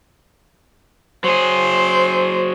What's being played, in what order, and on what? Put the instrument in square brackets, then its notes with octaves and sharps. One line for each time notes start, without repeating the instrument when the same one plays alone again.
[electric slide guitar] F#3 G#4 [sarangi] C5